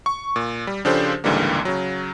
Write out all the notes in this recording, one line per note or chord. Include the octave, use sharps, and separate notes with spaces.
C#6
A#2
G3
C#3 F3 D4 G4 A4 C5
C#2 G#2 D3 E3 G3 A#3
C#3 F#3